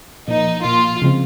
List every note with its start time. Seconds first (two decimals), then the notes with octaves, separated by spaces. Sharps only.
0.27 A#2 F3 A#3 D#4
0.64 A#2 F3 A#3 F4
1.02 C#3 F3 G#3 C4